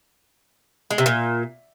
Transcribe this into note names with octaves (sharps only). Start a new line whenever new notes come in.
G#3
C3
A#2